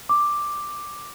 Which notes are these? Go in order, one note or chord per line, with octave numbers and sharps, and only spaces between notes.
D6